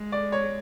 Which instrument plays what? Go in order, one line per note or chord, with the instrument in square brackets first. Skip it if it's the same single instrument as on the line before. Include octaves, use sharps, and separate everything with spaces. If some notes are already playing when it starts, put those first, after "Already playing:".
Already playing: [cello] G#3
[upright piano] D5
C#5